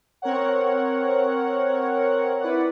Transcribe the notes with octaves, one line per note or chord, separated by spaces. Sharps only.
C4 A#4 C#5 F#5
E4 B4 D5 F#5